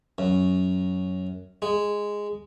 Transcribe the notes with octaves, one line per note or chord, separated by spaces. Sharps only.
F#2
G#3